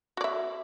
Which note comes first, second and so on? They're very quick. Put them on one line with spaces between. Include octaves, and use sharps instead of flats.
F#4 D5 E5